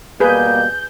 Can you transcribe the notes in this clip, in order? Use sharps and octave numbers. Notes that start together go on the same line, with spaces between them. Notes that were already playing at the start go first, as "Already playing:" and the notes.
B2 G3 A#3 G#4 B4 G6